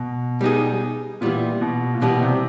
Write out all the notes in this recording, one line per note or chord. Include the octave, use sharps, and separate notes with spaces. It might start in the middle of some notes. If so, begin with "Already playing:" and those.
Already playing: B2
G3 B3 D#4 G#4
A#2 E3 G3 B3
B2
A#2
B2 E3 G3 B3
C3